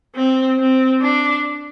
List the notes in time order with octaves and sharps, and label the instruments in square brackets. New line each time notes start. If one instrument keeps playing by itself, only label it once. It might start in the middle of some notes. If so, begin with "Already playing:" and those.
[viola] C4
C4
D4